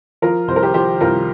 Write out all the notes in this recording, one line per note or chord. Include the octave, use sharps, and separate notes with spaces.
F3 F4 A#4
C2 C5
A#4
G4 C5
F3 G4 C5
C2 F4 A#4